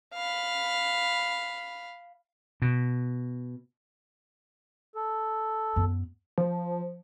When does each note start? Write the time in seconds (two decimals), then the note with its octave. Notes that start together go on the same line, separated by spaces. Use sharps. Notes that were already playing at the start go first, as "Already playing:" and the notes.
0.14 F5 B5
2.62 B2
4.95 A4
5.76 F#2 B3
6.38 F3